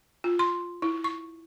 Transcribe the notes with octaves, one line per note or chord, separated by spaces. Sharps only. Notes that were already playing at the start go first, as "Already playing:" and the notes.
F4
C6
E4
C#6